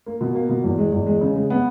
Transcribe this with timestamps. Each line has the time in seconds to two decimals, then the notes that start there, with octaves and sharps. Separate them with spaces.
0.06 A#3
0.21 B2
0.35 A#3
0.49 B2
0.64 E2
0.78 G#3
0.92 E2
1.06 G#3
1.21 C#3
1.36 G#3
1.50 B3